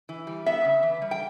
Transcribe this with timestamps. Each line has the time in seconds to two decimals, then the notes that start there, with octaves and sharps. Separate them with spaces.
0.09 E3
0.27 G3
0.46 B3 E5
0.65 C#3
0.83 E3
1.02 G3
1.11 G5